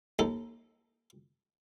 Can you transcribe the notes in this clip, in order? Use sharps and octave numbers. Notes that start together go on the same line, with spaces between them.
D#2 D#4 A4